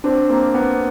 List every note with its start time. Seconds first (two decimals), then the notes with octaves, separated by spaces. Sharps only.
0.04 C4 D4
0.29 A#3 C4
0.55 B3